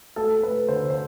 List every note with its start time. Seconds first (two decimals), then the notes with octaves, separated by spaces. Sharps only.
0.16 A3 A4
0.43 A3 B4
0.68 D3 C5
0.90 C5